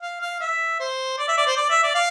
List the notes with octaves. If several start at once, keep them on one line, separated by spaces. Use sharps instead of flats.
F5
F5
E5
C5
D5
E5
D5
C5
D5
E5
D5
F5